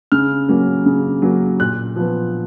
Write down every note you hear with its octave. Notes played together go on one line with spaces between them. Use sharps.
C#3 F6
F#3 A#3 C#4
C#3
F#3 A#3 C#4
A#2 F#6
F3 B3